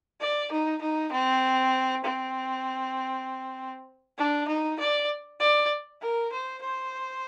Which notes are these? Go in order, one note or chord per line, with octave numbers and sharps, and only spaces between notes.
D5
D#4
D#4
C4
C4
D4
D#4
D5
D5
A#4
C5
C5